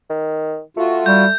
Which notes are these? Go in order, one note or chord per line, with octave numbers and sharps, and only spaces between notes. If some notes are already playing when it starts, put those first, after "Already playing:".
D#3
A3 F4 F#4
G3 G6